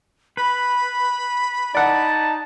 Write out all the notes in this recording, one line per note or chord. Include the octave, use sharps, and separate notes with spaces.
B4 B5
D#4 D5 F#5 A5